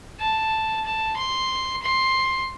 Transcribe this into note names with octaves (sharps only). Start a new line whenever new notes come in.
A5
A5
C6
C6